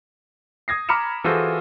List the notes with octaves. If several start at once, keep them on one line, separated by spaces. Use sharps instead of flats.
D#6 G#6 A#6 C7
A#5 B5 D6 F6 C#7 E7
E3 F4 F#4 G#4 A4 C5